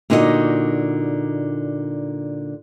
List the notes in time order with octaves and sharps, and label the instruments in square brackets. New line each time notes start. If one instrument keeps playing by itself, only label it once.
[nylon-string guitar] A#2 D3 D#4 F#4 A#4 D#5